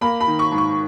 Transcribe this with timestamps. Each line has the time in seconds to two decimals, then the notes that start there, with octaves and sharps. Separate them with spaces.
0.01 A#3 B5
0.20 B5
0.27 D#3
0.39 C#6
0.52 G#2
0.58 C#6